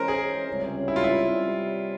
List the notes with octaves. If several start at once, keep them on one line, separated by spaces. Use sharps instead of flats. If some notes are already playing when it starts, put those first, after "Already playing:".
Already playing: E3 G#3 C#4 A#4 C5
G#4
C#2 C3 G3 C#4
E4
F4
E4
C3 G3 C#4